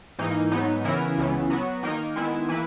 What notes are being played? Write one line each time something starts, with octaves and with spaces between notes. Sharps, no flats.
G#2 E3 A#3 D#4
G#2 F#3 B3 D#4
C#3 E3 B3 E4 A#4
C#2 C#3 E3 B3
F#3 B3 F#4
D#3 A#3 D#4 A#4
D#3 G#3 B3 E4
E3 A#3 E4 B4